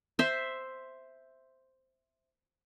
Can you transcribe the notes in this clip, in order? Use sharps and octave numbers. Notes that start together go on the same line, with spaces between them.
C5 E5